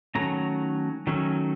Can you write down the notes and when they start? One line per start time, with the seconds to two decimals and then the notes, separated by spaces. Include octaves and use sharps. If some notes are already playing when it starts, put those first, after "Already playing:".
0.15 D#3 F#3 A3 C#4 A#5
1.07 D#3 F#3 A3 C#4